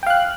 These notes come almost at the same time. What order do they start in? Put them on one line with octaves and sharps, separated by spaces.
G5 F5 F#6